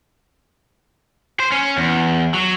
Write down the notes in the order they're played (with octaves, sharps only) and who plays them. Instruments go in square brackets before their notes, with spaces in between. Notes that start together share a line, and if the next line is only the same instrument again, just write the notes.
[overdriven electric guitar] C5
C#4
E2
F#3